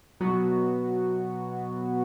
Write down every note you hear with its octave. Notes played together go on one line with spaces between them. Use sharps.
B2 F#3 B3 F#4